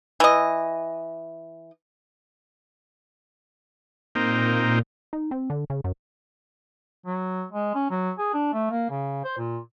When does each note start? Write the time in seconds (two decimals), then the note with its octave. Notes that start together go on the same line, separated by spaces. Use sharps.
0.20 E3 D#5
4.15 A#2 A#3 C4 D#4
5.13 D#4
5.31 C4
5.50 D3
5.70 C#3
5.84 F#2
7.06 F#3
7.52 G#3
7.75 C#4
7.91 F#3
8.19 G#4
8.34 D4
8.54 A3
8.71 A#3
8.90 C#3
9.24 C5
9.37 A#2